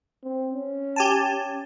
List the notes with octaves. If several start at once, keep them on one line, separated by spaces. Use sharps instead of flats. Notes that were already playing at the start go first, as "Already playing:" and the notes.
C4
C#4
G4 G#5 A5
C#4